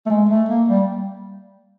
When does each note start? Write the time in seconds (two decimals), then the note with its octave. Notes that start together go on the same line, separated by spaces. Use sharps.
0.06 A3
0.10 G#3
0.29 A3
0.49 A#3
0.68 G3